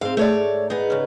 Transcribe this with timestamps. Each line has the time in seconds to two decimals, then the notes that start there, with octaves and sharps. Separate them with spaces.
0.01 G#2 C4 F5
0.17 A3 C#5 D5
0.70 B3 D#4 G#4
0.90 C#3 C#4